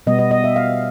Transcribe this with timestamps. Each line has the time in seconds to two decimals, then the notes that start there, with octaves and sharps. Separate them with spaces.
0.07 B2 G3 B3 D#5
0.19 D#5
0.31 D#5
0.44 E5
0.56 F5